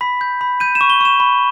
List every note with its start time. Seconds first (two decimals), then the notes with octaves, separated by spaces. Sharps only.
0.01 B5 B6
0.21 G6
0.41 B5
0.60 G6 D#7
0.75 E7
0.81 C#6
0.90 G7
1.01 C#6 E7
1.20 B5